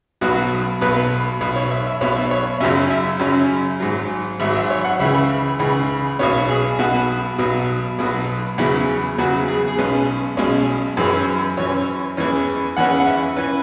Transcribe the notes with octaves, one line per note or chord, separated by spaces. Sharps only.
B1 B2 F#3 B3 F#4
B1 B2 F#3 B3 B4
B1 B2 B3
C#5
E5
E5
B1 B2 B3 C#5
E5
C#5
F#2 C#3 F#3 C#4 E5
E5
F#2 C#3 F#3 C#4
G#1 G#2 F#3
G#1 G#2 F#3 E5
E5
C#5
F#5
C#2 C#3 E3 E5
C#2 C#3 E3
B1 B2 B3 C#5
G#4
B1 B2 B3 F#4
B1 B2 F#3 B3
B1 B2 F#3 B3
E2 C#3 F#3 B3 E4
E2 C#3 F#3 B3 F#4
G#4
G#4
B1 B2 G#3 C#4 B4
B1 B2 G#3 C#4 C#5
F#2 E3 C#4 G#4
F#2 E3 C#4 C#5
E2 E3 C#4
E2 E3 C#4 F#5
F#5
E5
E3 C#4 B4